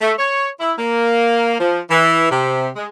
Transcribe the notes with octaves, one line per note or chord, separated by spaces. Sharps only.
A3
C#5
E4
A#3
F3
E3
C3
G#3